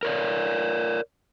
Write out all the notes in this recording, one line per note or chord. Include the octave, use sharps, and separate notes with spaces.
A#4 C#5 D5